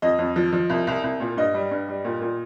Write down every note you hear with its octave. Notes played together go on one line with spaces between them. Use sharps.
F2 D#5
F2
F3
F3
C2
C2
C2
A#2
G2 D#5
G3
G2
G3
A#2
A#2